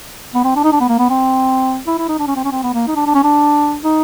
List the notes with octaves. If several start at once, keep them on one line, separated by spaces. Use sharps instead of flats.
B3
C4
D4
D#4
D4
B3
A#3
B3
C4
E4
E4
D#4
D4
C#4
C4
C#4
C4
B3
A#3
D#4
D4
D4
C#4
D4
D#4